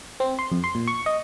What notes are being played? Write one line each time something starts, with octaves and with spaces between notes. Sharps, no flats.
C4
C6
F2
C6
A#2
C#6
D#5